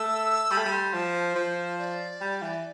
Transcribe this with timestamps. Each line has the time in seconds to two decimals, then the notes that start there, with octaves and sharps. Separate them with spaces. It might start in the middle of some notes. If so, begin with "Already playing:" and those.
Already playing: A3 E6
0.51 G3 B5
0.58 A3
0.65 G3
0.72 C6
0.93 F3 A5
1.14 C5
1.35 F3
1.79 D5
2.21 G3
2.42 E3